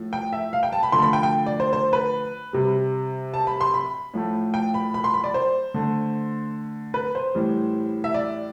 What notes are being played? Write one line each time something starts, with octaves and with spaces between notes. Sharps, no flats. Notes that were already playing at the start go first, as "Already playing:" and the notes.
Already playing: A2 F3 A3
G5
E5
F5
G5
A5
B5
D3 F3 A3 C6
B5
G5
G5
D5
C5
C5
B4
C3 G3
A5
B5
C6
B5
A2 F3 A3
G5
B5
B5
C6
B5
D5
C5
D3 A3
B4
C5
A2 E3 G3
E5
D5